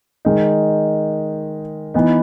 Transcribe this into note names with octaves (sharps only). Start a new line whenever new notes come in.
D#3 G#3 D#4
E3 B3 D#4